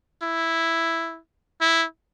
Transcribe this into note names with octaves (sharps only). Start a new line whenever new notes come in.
E4
E4